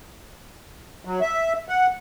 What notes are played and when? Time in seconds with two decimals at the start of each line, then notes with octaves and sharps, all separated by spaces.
1.05 F#3
1.21 E5
1.69 F#5